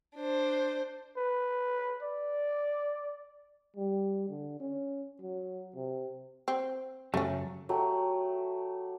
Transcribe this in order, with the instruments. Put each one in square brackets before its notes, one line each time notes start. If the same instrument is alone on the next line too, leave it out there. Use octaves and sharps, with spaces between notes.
[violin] D4 C5
[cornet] B4
D5
[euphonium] G3
D3
C#4
F#3
C3
[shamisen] C4
[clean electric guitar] F#2 C#3 F#3 [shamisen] A3 C#4
[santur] F#3 A3 G4